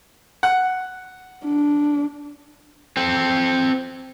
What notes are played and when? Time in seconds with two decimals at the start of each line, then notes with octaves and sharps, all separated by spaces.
0.43 F#5
1.45 D4
2.97 C4 A4